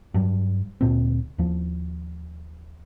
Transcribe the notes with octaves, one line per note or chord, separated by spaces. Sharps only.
G2 F#3
D2 A#2 C4
D#2 F3